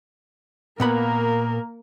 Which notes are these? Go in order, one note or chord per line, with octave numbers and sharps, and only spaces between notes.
A#2 A#3 B3 A#4 B5